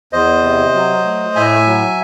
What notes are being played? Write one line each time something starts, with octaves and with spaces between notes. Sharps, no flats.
E2 C5 D#5
C3
F#3
A3
A2 E5 G#5
F#3